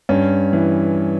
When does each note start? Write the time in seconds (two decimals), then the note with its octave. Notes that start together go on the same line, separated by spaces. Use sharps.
0.09 G2 C#4
0.53 E3